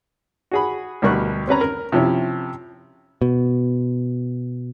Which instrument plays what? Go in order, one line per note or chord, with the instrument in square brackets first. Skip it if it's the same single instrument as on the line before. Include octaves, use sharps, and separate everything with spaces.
[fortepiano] F#4 G#4 B5
D2 B2 G3 A#4 C#6 F#6
C4 C#4 B4 A#5
A#4
C3 F3 C#4 E4
[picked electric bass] B2